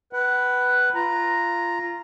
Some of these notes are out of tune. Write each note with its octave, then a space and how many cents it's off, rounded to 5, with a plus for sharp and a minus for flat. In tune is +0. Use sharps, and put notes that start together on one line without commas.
B4 +0 F#5 +30
F4 -15 A#5 +0